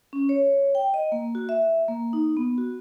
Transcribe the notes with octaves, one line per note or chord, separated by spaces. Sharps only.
C#4
C#5
G5
D#5
A#3
F#4
E5
A#3
D#4
B3
F#4